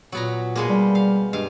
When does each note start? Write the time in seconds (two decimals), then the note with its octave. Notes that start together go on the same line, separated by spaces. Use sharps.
0.12 A#2 F#3 B3 A#5
0.55 B2 G#3 A#3
0.69 G3
0.95 F5
1.33 G2 G#3 F5